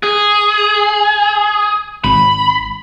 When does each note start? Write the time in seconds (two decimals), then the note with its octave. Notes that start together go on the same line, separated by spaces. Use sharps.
0.03 G#4
2.04 G#1 B5